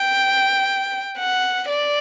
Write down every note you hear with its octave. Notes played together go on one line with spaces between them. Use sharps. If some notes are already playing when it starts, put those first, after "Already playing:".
Already playing: G5
F#5
D5